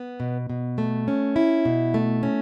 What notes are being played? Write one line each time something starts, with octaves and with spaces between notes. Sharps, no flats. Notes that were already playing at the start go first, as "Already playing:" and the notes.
Already playing: B3
B2
B2
A3
C#4
E4
B2
A3
C#4